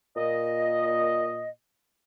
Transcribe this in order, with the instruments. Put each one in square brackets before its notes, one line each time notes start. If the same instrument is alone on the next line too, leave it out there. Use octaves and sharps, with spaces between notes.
[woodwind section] A#2 D#5